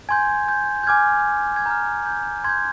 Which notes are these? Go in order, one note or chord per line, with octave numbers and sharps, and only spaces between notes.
G#5 C6 G6 G#6
G6
G6
G#5 D6 F6 G#6
G#6
A#5 F6 G6
G6
C6 G6 G#6